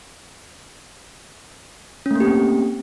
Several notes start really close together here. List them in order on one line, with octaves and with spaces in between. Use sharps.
C#4 A3 A#3 G4 C4